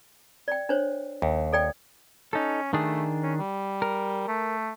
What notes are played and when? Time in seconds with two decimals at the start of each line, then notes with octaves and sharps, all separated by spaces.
0.48 D5 G5
0.69 D4 C5 C#5
1.22 D#2
1.53 A4 D5 G5
2.33 C#4 D#4 A4
2.73 D#3 A3 D4 G#4
3.23 C#4
3.39 G3
3.82 A#4
4.28 A3